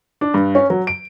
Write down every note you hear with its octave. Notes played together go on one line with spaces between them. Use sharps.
D4
G2
C#4
F#3
D7